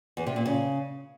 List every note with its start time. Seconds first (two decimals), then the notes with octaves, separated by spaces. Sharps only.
0.17 E2
0.26 C3
0.36 A#2
0.46 C#3